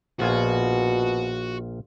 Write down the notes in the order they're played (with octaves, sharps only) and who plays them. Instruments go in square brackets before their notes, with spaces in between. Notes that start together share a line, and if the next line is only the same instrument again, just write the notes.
[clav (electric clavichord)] A#1 F4 G#5 [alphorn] B2 [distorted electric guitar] F#4